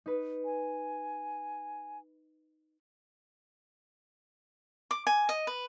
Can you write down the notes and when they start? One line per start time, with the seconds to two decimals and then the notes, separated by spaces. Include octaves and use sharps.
0.06 D#4 B4
0.45 G#5
4.91 D6
5.07 G#5
5.29 D#5
5.47 B4